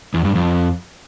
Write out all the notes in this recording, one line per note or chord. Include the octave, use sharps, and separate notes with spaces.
E2
G2
F2